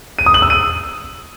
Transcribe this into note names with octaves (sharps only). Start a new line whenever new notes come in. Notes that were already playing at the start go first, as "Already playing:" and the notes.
D#7
D#6
F#7
E6
D#7